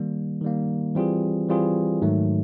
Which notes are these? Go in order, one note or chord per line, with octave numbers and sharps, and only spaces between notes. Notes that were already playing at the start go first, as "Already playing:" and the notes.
Already playing: D#3 G3 A#3
D#3 G3 A#3
E3 G3 C4 F4 G#4
E3 G3 C4 F4 G#4
G#2 D#3 F#3 A3